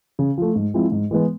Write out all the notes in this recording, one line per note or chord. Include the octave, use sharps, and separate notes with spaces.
C#3
F3 A3
G#2
F3 G#3 C4 E4
G#2
E3 G#3 B3